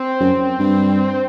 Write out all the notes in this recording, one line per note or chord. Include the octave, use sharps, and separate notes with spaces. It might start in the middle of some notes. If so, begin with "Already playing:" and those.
Already playing: C4
F#2
G2